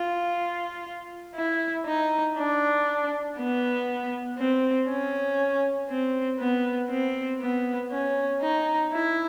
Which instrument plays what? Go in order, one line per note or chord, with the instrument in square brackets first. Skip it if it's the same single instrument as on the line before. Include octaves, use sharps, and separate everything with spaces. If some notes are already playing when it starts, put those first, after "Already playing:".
Already playing: [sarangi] F4
E4
D#4
D4
B3
C4
C#4
C4
B3
C4
B3
C#4
D#4
E4